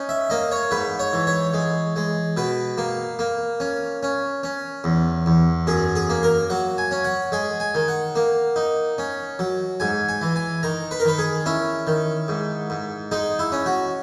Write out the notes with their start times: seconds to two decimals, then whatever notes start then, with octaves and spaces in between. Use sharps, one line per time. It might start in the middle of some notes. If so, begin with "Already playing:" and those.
Already playing: C#4 D#4
0.09 E5
0.30 A#3 D#5
0.52 C#5
0.71 G#2 B4
0.99 C#5
1.13 E3
1.27 C#5
1.54 G#3
1.96 G#3
2.37 B2 B4
2.78 A#3
3.19 A#3
3.60 C#4
4.03 C#4
4.43 C#4
4.84 E2
5.26 E2
5.67 F#2 G#4
5.96 G#4
6.09 A#3
6.23 A#4
6.50 F#3 F#5
6.78 G#5
6.91 C#4
7.04 F#5
7.32 G#3 G#5
7.60 G#5
7.75 D#3
7.88 F#5
8.15 A#3
8.56 D#4
8.98 C#4
9.39 F#3
9.80 G#2 G#5
10.09 G#5
10.21 E3
10.36 G#5
10.63 D#3 A#5
10.91 B4
11.00 A#4
11.05 D#3 B4
11.19 G#4
11.46 C#4 E4
11.87 D#3
12.28 G#2
12.70 G#2
13.12 G#3 D#4
13.39 E4
13.52 C#4
13.66 F#4